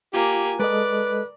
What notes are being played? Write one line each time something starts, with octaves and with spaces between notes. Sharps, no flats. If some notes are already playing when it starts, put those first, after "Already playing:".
A#3 F4 G4 G#5
G#3 A4 B4 D5 D#5